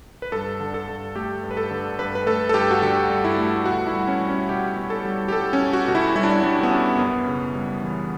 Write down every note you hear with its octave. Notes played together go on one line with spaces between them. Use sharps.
B4
G2 A4
D3
A4
G2
A3 G4
G2
B4
A4
D3
G2 B4
B4
A3 A4
A4
G2 G4
F#4
D3 G4
G2
E4
A3
B2 F#4
E4
G3
C#4
G3
C#4
B2 G4
B2
A4
G3
G4
G3 A4
C#4
B2
F#4
B2 F#4
E4
G3 E4
D4
E4
G3 D4
B3
B2 C#4
F#2 B3
C#3
G3
E3